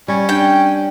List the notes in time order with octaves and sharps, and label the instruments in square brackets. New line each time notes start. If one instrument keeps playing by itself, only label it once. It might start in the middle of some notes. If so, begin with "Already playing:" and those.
[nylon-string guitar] G3 [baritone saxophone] C#4
[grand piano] D4 [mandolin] G5